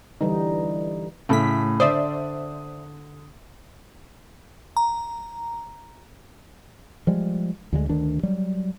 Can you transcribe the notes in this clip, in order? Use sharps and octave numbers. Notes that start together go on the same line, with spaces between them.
D3 E3 G3 D#4
A2 C#3 A3 A4 B6
D3 C5 D5 E5 D#6
A#5
F3 G3 G#3
D2 D3 F3 G#3
D2 D#3 D4
F#3 G3